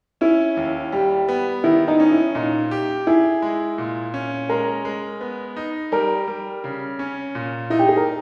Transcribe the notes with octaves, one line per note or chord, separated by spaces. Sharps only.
C#4 E4
D#2
G3 G4
B3
D#3 E4
D#4
C#4
E4
A#2 D#4
G4
E4 G#4
G#3
A#2
C#4
G#3 A#4
G#3
B3
D#4
G3 A#4
G3
C#3
C#4
A#2
D#4 E4
G4
G#4
A#4